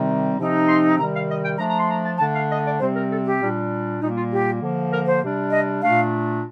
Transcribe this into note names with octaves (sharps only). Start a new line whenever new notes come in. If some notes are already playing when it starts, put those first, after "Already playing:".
Already playing: C3 D#3 G3 C4 D#4
C3 F3 C4 D#4
C6
C3 D#3 G3 A#5
F5
D#5
G5
F3 A3 D4 A#5
A#5
C6
A#5
A5
D3 A3 D4 A5
F5
D#5
D5
C3 G3 C4 C5
A#4
A4
G4
A#2 G3 D4
A#2 G3 A#3 D#4
F4
G4
D3 F3 A#3
A#4
C5
C3 G3 D4
D#5
A#2 A3 D4 F5